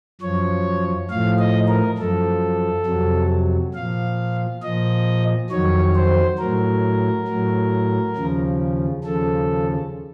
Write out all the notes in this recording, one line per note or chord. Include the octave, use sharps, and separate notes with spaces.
F#2 F3 C#5
A2 F3 F5
D#5
A#4
F#2 F3 A4
F2 C3 F#3
A#2 F3 F5
A#2 F3 D#5
F2 D#3 F#3 C#5
C5
A2 F#3 A#4
A2 F#3
D#2 C#3 F3
D#2 C#3 F3 A4